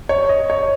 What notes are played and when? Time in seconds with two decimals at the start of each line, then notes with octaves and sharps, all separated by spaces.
0.09 C#5
0.29 D#5
0.50 C#5